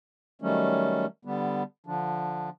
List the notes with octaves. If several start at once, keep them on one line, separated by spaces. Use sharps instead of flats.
D#3 F#3 G3 A3 C#4
D3 G3 B3
D3 F3 D4